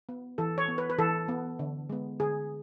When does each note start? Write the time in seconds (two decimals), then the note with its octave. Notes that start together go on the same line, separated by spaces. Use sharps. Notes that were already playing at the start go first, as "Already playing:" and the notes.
0.09 B3
0.38 E3 A4
0.58 C#5
0.68 B3
0.78 B4
0.90 B4
0.99 E3 A4
1.28 B3
1.59 D3
1.89 G#3 B3
2.20 D3 G#4